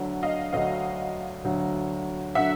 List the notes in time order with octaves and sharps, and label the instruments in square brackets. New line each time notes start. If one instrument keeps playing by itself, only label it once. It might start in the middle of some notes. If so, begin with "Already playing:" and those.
Already playing: [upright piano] D2 D3 F#3
[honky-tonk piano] D#5 F5
[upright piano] D2 D3 F#3 [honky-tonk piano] D#5 F5
[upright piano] D2 D3 F#3
[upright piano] D3 F#3 [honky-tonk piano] E5 F#5